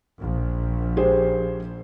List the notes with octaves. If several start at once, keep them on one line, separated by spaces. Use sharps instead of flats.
A#1
G4 G#4 C5